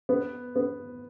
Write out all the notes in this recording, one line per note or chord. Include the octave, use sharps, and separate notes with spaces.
B3
B3